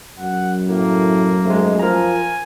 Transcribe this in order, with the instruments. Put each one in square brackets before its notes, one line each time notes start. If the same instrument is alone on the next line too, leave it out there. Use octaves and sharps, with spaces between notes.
[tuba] F#2 [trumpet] F#5
[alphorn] A2 [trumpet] A#3
[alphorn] G#2 [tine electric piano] G#3 A3
[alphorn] F3 [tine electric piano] A#4 A#5 [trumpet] G#5